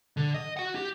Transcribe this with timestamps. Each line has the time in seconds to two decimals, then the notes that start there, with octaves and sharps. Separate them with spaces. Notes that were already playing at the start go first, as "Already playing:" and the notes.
0.17 D3
0.34 D#5
0.57 F#4 F#5
0.76 G4